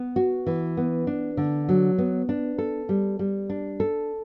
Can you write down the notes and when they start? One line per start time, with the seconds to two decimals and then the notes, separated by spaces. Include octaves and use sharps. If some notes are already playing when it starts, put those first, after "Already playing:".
Already playing: B3
0.16 F#4
0.47 E3
0.77 B3
1.07 D4
1.37 D3
1.69 F#3
1.98 B3
2.29 D4
2.58 A4
2.89 G3
3.19 G3
3.49 D4
3.80 A4